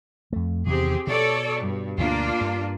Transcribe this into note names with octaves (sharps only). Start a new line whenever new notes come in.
F2 A3
E2 C3 D#3 C4 G4 G#4
B2 A4 C#5 D5
G2
D2 B2 A#3 D4 F4
G2